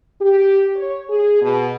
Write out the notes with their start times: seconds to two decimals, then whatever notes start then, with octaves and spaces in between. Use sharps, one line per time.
0.22 G4
0.76 C#5
1.10 G#4
1.42 B2